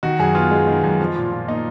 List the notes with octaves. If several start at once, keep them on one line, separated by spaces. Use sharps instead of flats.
D#3 F#4
F#2 G#4
B3 F4
G#3
D#3
F#2
F3
A#2
A#2
A#3 D#4